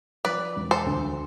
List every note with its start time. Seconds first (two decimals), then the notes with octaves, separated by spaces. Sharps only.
0.25 F3 B4 D5
0.56 E1
0.71 A4 C5
0.86 D2